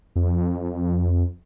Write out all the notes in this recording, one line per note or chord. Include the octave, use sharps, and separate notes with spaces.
F2